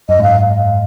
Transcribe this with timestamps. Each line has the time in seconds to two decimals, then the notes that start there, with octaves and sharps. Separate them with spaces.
0.09 F#2 D#5
0.19 G#2 F5